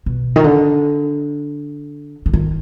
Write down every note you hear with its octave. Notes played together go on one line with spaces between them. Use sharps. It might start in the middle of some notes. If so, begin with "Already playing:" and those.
B2
D#3
D3
D3
D#3